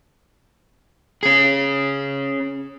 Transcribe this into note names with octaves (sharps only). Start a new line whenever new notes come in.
C#4 G#4